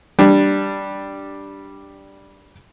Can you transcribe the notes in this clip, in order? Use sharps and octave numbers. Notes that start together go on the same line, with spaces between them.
G3 D4